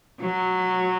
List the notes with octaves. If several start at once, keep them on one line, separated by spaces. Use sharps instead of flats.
F#3